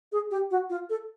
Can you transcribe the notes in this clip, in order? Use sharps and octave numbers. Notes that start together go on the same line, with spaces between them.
G#4
G4
F#4
F4
A4